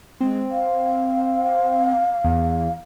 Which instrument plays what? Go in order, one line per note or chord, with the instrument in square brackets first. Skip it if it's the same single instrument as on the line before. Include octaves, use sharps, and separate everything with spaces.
[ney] G#3 [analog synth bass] C4
[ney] F5
[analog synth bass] E2